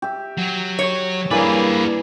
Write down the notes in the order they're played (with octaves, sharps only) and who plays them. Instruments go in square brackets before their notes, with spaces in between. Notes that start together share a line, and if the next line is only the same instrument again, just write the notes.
[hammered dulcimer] G4 E5
[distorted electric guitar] F#3
[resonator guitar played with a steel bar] C#5
[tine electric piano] G2 A#3 D5 [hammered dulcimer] E3 [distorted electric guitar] G#4 B4